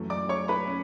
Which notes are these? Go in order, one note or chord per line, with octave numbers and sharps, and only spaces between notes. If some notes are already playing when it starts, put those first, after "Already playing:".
Already playing: F#2 E3 A3
D5 D6
C#5 C#6
B4 B5
C#4